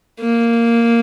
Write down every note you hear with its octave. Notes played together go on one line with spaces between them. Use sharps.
A#3